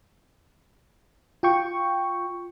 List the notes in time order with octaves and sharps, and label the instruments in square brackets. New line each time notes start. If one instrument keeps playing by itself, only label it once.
[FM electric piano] F4 G5 C#6